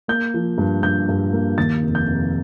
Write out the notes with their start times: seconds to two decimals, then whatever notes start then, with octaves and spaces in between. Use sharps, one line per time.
0.08 A#3 G6
0.34 F3
0.58 G2
0.83 G2 G6
1.09 G2
1.32 A#3
1.58 D#2 A6
1.83 F1
1.95 G6
2.07 F1